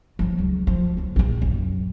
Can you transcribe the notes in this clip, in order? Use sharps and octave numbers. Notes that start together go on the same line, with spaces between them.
F3 F#3
C#2
F3
D3 F#3
A#1 D#3
F#2